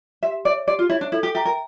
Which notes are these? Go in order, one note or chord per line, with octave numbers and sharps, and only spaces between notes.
G4 E5
C#5 D5 E5
G4 D5
F4
E4 C#5 E5
D4
E4 A4
G4
G4 E5 G5 A#5
A#4